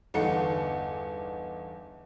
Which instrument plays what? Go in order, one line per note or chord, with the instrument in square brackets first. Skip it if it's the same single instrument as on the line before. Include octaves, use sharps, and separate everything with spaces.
[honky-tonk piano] G1 E2 D#4 A4 F#5 C#7